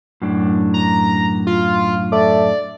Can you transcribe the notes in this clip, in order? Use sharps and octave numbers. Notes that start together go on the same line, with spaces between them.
F#2 A2 D4
A#5
F4
A3 D5